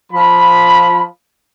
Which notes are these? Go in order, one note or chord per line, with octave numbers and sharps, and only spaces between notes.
F3 B5